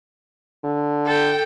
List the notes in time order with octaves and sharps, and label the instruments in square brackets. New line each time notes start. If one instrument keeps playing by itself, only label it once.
[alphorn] D3
[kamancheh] A4 G5